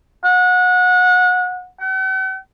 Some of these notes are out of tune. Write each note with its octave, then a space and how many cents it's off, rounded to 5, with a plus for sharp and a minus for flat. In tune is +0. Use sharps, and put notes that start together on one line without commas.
F#5 -25
F#5 +45